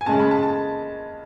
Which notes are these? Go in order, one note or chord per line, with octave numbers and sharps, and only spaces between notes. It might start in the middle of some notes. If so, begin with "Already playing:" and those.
G#5
C#3 G#3 C#4 A5
B5
A5
A5